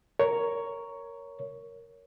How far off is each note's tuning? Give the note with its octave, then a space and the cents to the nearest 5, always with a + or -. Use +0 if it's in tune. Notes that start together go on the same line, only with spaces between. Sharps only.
A#4 +0 C#5 +10